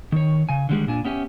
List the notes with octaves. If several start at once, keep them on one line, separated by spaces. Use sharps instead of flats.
D#3 C#5
C#3 G#5
D3 D#3 G3 G#3 G4 G#4
A#2 D4 G#5
B3 C#4 G4 E5 G#5